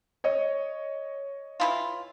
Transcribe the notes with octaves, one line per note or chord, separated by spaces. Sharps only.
C#5 D#5
E3 E4 F4